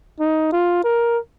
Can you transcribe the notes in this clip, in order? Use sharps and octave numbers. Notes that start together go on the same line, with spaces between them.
D#4
F4
A#4